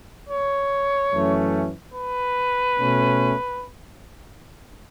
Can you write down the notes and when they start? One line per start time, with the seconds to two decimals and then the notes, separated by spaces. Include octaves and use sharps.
0.30 C#5
1.12 F#2 E3 A3 C#4
1.94 B4
2.76 B2 A3 C#4